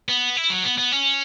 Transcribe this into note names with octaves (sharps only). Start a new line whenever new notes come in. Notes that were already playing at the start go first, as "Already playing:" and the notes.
B3
E4
F#3
B3
B3
C#4